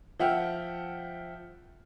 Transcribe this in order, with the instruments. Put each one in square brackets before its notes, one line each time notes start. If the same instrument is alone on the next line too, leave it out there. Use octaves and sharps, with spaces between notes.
[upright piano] F3 E5 F#5 G5 F6